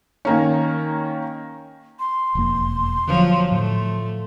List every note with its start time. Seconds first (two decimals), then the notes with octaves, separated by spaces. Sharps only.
0.25 D#3 A#3 C#4
1.99 C6
2.35 E1 F2 A#3
3.08 D3 F3 F#3
3.52 A2 A3